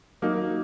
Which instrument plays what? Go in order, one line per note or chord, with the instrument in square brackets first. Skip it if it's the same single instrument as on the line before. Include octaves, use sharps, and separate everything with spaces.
[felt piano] F#3 A#3 D#4